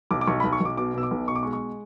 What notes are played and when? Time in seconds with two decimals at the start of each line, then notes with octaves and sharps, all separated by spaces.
0.11 B1 D6
0.21 D6
0.27 B1 C#6
0.40 B1 B5
0.53 C#6
0.61 B1 D6
0.77 B2 D6
0.94 B2 E6
1.03 D6
1.11 B1
1.28 B2 C#6
1.36 D6
1.43 G#3 C#6
1.53 C#6